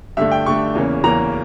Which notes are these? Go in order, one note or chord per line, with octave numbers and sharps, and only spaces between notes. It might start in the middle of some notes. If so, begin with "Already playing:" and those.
G2 D3 A3 E5
G5
G2 D3 A3 C#6
E2 C#3 E3 A#3 C#4
E2 C#3 E3 A#3 C#4 A#5